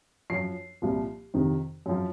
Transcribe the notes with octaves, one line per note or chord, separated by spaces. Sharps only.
F#2 F3 C7
C2 A#2 F3
F2 C3 D#3
F#2 F3